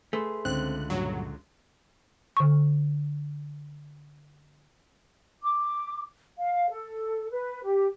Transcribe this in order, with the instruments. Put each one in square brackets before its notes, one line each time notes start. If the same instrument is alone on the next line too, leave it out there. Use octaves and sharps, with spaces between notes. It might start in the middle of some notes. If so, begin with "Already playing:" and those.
[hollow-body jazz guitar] A3 [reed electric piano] G#4 B4 C6
[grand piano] C#2 D3 [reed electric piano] C4 [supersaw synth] F#6
[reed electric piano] G2 A#2 [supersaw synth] F#3
[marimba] D3 C#6
[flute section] D6
F5
A4
B4
G4